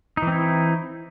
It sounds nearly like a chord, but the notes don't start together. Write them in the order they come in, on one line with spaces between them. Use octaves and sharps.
D#4 E3 C4 E4